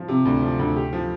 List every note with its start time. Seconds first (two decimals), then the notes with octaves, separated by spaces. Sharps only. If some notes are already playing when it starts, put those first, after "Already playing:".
Already playing: F3
0.08 C3
0.25 D2
0.42 F3
0.59 D2
0.76 G4
0.93 F3